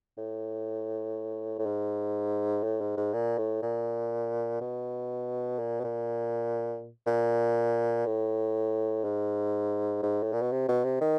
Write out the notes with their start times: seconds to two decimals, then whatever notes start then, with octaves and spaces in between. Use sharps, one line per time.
0.18 A2
1.59 A2
1.66 G#2
2.64 A2
2.81 G#2
2.97 G#2
3.14 A#2
3.38 A2
3.62 A#2
4.61 B2
5.59 A#2
5.80 B2
5.84 A#2
7.07 A#2
8.06 A2
9.04 G#2
10.02 G#2
10.23 A2
10.33 A#2
10.42 B2
10.52 C3
10.69 B2
10.85 C3
11.01 D#3